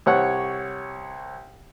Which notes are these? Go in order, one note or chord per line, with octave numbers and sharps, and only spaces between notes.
C2 C#5 F#5